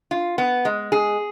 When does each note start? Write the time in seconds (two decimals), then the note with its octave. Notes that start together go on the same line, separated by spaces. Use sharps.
0.11 F4
0.38 B3
0.65 G#3
0.92 G#4